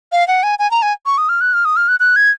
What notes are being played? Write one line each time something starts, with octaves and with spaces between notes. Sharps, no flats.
F5
F#5
G#5
G#5
A#5
G#5
C#6
D#6
F6
F#6
F6
D#6
F6
F#6
F#6
G#6